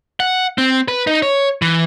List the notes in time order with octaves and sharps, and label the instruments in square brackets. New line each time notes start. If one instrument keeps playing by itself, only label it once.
[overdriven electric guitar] F#5
C4
B4
D#4
C#5
E3